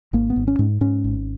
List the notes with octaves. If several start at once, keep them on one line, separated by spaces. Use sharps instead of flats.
G#1 A#3
B3
G#1
C#4
G#2
G#2 C#4
G#1